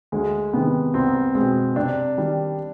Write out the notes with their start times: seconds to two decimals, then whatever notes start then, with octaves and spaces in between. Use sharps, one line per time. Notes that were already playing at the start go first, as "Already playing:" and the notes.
0.12 D2 G#3
0.53 C3 D#3 B3
0.94 C2 C4
1.35 B2 G#3 C4
1.76 C3 D4
2.18 D#3 G3